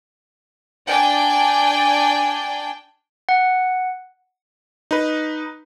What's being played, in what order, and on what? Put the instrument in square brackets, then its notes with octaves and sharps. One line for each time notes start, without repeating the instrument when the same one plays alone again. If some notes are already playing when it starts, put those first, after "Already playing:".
[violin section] D4 D5 G5 G#5
[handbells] F#5
[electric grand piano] D#4 B4